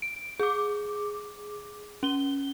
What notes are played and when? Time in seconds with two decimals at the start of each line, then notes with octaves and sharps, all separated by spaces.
0.02 D7
0.39 G#4 D6
2.03 C#4 G7